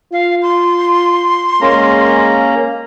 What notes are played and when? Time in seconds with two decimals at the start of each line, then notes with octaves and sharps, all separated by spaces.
0.13 F4 F5
0.42 C6
1.61 G#3 A#3 C#4 A#5